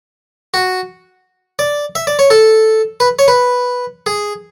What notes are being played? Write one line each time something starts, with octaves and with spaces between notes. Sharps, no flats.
F#4
D5
E5
D5
C#5
A4
B4
C#5
B4
G#4